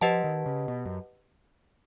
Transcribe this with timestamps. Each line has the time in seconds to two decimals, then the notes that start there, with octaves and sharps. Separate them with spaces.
0.01 F3 G4 B4 D#5 F#5 A5
0.24 D#3
0.46 C#3
0.68 B2
0.85 F#2